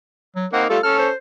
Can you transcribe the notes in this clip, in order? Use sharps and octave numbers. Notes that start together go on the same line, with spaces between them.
F#3
A#3 C4 D#4 F#5
G3 A3 F4 A4
C#4 A4 F6
C5